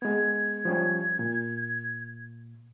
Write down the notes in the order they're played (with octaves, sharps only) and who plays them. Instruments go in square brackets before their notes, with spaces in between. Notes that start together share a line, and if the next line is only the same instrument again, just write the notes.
[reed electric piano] G#3 B3 [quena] G#6
[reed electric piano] F3 G3 C#4
A#2